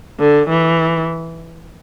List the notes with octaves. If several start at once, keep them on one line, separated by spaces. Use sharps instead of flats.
D3
E3